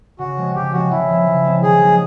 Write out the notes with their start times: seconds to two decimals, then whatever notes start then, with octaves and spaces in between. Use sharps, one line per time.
0.19 C#3 F#4
0.37 F3 G#3 C4
0.55 C#3 G4
0.73 F3 G#3 C4 F#4
0.90 C#3 E4
1.09 F3 G#3 C4
1.27 C#3
1.45 F3 G#3 C4
1.63 D#3 G#4
1.81 F#3 A#3 D#4